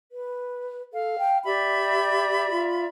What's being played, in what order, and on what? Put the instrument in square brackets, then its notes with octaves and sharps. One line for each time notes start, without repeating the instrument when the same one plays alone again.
[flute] B4
[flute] A4 [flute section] F5
[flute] G5
[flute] G4 [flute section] D5 E5 B5
[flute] F4